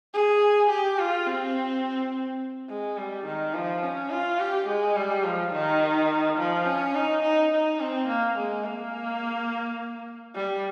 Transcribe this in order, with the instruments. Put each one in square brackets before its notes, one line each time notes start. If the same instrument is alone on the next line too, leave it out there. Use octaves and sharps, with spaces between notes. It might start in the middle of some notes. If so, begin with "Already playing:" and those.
[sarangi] G#4
G4
F4
C4
G#3
G3
D#3
F3
C#4
F4
G4
G#3
G3
F3
D#3
F3
C#4
D#4
D#4
D#4
C4
A#3
G#3
A#3
G3